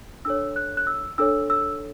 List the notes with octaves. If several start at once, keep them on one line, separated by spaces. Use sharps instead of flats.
D4 A4 C#5 E6
F#6
F#6
E6
D4 A4 C#5 E6
E6